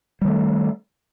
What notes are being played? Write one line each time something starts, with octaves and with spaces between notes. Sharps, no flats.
D#3 G3 A3